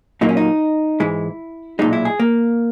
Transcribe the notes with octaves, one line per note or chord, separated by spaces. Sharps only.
A#2 F#3 A#3 D#4
C#4
D#4
G#2 E3 G#3 E4
B1 A#2 G#3 D#4
E4
G#4
A#3